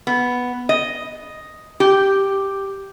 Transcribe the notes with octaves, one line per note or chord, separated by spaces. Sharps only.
B3
D#5
G4